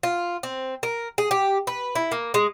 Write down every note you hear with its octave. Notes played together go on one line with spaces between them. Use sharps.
F4
C4
A#4
G#4
G4
B4
E4
A#3
G#3